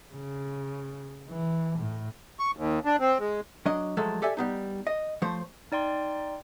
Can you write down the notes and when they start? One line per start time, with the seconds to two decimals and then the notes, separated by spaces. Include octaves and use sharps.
0.13 C#3
1.29 E3
1.79 A2
2.39 C#6
2.57 D#2
2.85 D4
3.00 C4
3.20 G#3
3.66 F#3 D4 D#5
3.97 F3 F#3 G#3 A3 A4
4.22 G4 A4 D5 E5 G#5
4.37 G3 B3 D#4
4.87 D#5
5.22 F3 A3 C5 C#5
5.72 D#4 D5 G5 C6